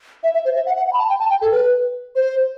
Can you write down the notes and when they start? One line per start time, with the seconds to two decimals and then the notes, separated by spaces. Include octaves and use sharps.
0.23 E5
0.34 E5
0.45 C5
0.56 E5
0.66 F#5
0.76 F#5
0.87 F#5
0.93 B5
0.98 A5
1.09 G5
1.20 A5
1.30 G5
1.41 A4
1.51 B4
2.15 C5